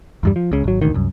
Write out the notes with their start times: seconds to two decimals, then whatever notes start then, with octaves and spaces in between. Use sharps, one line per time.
0.23 E2 G2 G3
0.36 F3
0.52 C#2 C#3
0.64 G#1 F#3
0.81 E1 A1 D2 D#3
0.94 C2 F#2